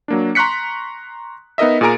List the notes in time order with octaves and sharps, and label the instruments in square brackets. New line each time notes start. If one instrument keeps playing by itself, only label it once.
[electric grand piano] F#3 A#3 D4
A#5 C6 C#6 F#6 B6 C#7
B3 D#4 A#4 D#5 E5
A#2 G#4 A#4 G#5 A#5 D7